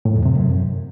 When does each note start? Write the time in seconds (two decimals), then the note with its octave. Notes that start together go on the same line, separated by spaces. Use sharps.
0.05 A2
0.15 F2
0.25 C3
0.36 F#2